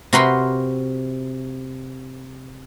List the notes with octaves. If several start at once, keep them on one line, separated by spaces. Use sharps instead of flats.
C3 F#4 A#4 B4 B5 C6